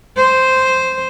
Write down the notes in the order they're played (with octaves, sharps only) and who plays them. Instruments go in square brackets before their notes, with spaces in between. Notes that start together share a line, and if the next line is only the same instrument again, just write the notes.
[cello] C5